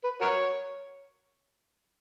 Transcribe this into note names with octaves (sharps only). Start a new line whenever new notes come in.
B4
F#4 A#4 C#5